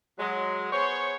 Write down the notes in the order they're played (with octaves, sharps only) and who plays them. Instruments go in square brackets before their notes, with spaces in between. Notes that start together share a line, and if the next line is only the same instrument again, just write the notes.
[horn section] F#3 G#3
B3 G#4 C5 C#5